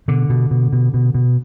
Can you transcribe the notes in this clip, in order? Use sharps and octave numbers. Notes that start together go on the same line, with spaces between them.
B2 D3
B2
B2
B2
B2
B2